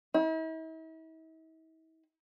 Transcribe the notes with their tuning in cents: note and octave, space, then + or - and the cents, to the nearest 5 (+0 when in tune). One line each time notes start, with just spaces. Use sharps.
E4 -45